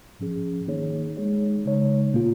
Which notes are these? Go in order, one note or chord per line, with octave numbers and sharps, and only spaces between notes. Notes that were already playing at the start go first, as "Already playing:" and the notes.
G#2 F3 C#4 G#4
D#3 A#3 D#4 G#4 C#5
G#3 D#4 G#4 C#5
C#3 G#3 D#4 C#5
A#2 A#3 F4